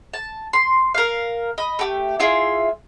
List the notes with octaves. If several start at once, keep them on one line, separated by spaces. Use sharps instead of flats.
A5
C6
A#4 F5
D#5 B5
A3 G4
E4 F4 G#4 E5